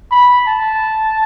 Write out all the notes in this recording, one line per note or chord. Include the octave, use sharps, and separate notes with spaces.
B5
A5